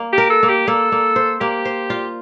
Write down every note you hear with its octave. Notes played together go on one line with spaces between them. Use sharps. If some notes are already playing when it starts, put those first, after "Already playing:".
Already playing: A#3
G4
A#4
A4
A#3
G4
A#3 A4
A#3
C5
A#3 G4
C5
F4